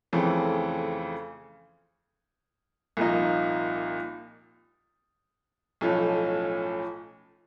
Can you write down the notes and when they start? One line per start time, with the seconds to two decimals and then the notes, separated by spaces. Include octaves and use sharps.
0.13 F2 C#3 E3 A3 C4
2.97 C2 A#2 F3 A#3 D#4
5.81 B1 A2 F3 A3 C#4